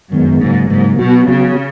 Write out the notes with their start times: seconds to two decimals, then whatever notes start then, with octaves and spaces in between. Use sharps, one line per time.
0.12 F#2 D#3 G#3 B3
0.41 G#2 C#3 F#3 A#3
0.70 G#2 C#3 F#3 A#3
0.99 B2 F#3 B3 F#4
1.28 C#3 F#3 B3 F#4